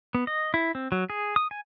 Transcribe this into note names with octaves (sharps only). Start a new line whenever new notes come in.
B3
D#5
E4
C4
F#3
G#4
D#6
G#5